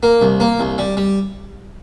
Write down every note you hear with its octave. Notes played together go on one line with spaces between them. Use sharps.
A#3
C2
A#3
C2
G3
G3